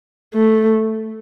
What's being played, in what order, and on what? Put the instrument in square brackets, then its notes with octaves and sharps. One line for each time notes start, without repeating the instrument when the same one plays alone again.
[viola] A3